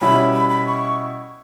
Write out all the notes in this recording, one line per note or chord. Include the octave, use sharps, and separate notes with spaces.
B2 G3 C#4 E4 B5
B5
B5
C#6